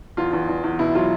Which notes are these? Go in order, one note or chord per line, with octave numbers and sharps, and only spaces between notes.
E2 F4
E2
E2
E2
B2 E4
F#3 F4